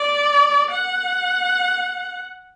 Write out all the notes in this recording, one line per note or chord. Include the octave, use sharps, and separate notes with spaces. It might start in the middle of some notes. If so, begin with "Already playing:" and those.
Already playing: D5
F#5